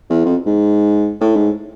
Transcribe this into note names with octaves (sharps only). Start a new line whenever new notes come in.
E2
F2
G#2
A2
G#2